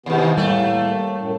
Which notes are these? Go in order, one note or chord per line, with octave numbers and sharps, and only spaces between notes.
D#2 G#2 C3 E3 B3
A2 G3 A3 A#3
F#2 A2